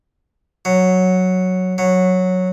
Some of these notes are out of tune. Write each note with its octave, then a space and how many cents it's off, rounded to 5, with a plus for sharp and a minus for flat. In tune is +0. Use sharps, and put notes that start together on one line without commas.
F#3 -5
F#3 -10